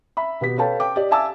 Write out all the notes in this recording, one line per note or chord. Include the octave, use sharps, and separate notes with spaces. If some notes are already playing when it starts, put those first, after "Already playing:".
E5 B5
B2 B3 G4 B6
A4 B4 C#5 F5 G5 A5
G5 D6
G4 D5 D#5
E5 F5 G#5 A5 D6 E6